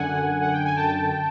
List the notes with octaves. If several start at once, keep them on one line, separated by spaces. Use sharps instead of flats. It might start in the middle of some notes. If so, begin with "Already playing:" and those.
Already playing: F#2 D3 F#5 G#5
F#5
G5
G#5
G5 A5